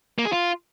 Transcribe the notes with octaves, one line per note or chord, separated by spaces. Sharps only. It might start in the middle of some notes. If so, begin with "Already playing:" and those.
A#3
G#4
F4